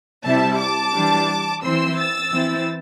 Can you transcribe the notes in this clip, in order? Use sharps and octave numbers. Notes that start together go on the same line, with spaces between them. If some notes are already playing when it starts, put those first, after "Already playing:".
C3 G3 E4 E5 A5
A5 D6
E3 G3 D4
E3 C4 E4 C6 E6
E6 A6
E3 C4 E4